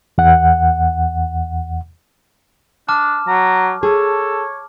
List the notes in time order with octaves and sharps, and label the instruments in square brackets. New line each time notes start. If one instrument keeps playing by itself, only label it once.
[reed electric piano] E2 F#5
[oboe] D4 [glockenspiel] A5 D6 F6
[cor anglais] F#3 [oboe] A#5
[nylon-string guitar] G#4 [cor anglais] A4 [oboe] C#5